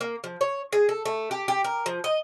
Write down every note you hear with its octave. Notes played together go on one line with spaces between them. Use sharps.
A#3
F3
C#5
G#4
A4
A3
G4
G4
A#4
F3
D#5